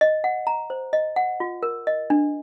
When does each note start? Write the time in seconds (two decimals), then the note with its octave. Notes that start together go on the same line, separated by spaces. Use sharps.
0.01 D#5
0.24 F#5
0.47 A#5
0.70 C5
0.93 D#5
1.16 F#5
1.40 F4
1.63 A#4
1.87 D#5
2.10 D4